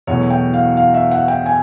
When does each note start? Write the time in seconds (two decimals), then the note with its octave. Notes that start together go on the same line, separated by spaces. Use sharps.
0.07 E2 B2 F#3 A3 C#5
0.30 G5
0.54 F5
0.77 F5
0.94 E5
1.11 F#5
1.28 G5
1.46 G#5